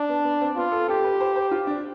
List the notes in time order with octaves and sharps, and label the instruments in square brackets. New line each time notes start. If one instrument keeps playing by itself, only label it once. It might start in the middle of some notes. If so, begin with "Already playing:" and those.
Already playing: [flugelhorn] D4
[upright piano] B3
B3
C4
[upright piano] B3 [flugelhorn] F4
[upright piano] A4
[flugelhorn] G4 [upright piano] A4
[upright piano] B4
C5
C5
F4
D4